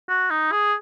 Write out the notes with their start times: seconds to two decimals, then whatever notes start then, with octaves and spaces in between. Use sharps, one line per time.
0.09 F#4
0.30 D#4
0.52 G#4